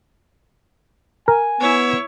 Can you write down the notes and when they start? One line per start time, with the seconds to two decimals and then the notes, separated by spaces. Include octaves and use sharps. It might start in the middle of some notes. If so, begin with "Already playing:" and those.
1.28 A#4 G#5
1.60 B3 E4 C#5